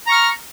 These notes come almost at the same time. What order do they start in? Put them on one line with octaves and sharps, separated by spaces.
A#5 C#6 F6